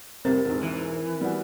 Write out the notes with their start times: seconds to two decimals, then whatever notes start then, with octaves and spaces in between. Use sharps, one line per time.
0.25 F1 C2 C4 A#4 A6
0.45 E1 E2 G#2
0.63 E3
1.21 G3 B3 F#4